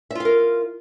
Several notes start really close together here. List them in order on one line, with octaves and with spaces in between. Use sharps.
E5 F4 F5 A#4